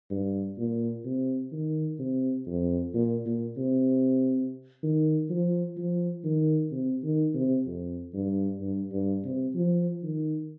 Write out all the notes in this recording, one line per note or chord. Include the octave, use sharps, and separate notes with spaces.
G2
A#2
C3
D#3
C3
F2
A#2
A#2
C3
D#3
F3
F3
D#3
C3
D#3
C3
F2
G2
G2
G2
C3
F3
D#3